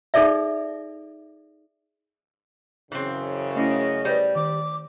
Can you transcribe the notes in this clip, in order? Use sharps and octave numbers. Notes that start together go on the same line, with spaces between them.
D#4 G#4 A4 D5 E5
F#2 C#3 E3 C4
A3 C#4 E4 D#5
G3 B4 C5
D#3 D6